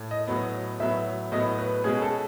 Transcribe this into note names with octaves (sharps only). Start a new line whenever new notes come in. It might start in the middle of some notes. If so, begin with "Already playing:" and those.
Already playing: A2
D#5
A2 F#3 B3
A2 F#3 B3 E5
A2 F#3 B3 D#5
B4
B2 G#3 C#4 G#4
A4